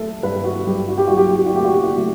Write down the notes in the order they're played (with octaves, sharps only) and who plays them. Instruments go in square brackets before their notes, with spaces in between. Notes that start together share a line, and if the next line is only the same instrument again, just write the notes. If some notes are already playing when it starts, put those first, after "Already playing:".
Already playing: [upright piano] A3 A4
G2 B4
F#4
G2 G4
F#4
G4
F#3 F#4
G4
F#4
G4
F#4
A3 G4
F#4
G4
F#4
A3 G4